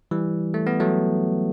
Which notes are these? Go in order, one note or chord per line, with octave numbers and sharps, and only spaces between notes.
E3 G3
A3
B3
F#3 A3